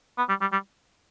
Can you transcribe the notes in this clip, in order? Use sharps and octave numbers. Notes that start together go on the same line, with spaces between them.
B3
G3
G3
G3